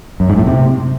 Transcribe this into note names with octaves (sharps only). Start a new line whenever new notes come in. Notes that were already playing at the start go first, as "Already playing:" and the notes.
F#2
G#2
A2
C3